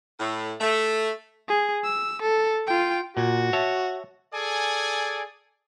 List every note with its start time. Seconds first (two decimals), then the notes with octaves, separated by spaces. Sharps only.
0.20 A2
0.60 A3
1.48 G#4
1.84 E6
2.22 A4
2.67 F4 G5
3.17 A#2 F#4
3.53 C#5 E5 A5
4.34 G#4 A4 D5 G#5